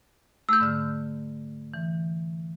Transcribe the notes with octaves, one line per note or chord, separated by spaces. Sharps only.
A3 E6 G6
G#2 D3 F6
E3